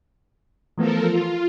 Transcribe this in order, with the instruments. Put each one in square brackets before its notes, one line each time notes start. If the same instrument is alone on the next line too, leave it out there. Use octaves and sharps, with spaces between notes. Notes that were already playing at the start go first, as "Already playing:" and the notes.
[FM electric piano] E3 A3 B3 [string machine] F3 A4 A#4
[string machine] F4